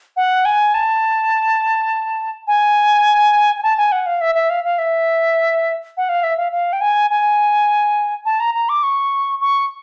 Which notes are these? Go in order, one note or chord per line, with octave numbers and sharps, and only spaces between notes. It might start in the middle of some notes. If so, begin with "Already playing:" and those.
F#5
G#5
A5
G#5
G#5
A5
G#5
F#5
F5
E5
E5
F5
F5
E5
F#5
F5
E5
F5
F5
G5
G#5
G#5
A5
A#5
A#5
D6
C#6
C#6